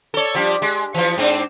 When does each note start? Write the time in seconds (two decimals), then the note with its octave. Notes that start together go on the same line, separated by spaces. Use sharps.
0.14 A4 C#5
0.35 F3 G3 D4
0.62 G#3
0.94 E3 F3
1.18 G#2 C4 D4